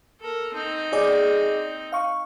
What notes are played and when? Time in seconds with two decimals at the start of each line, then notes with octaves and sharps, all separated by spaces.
0.20 A4 A#4
0.54 C4 D#4
0.92 G#4 D5 D#5
1.92 F5 C#6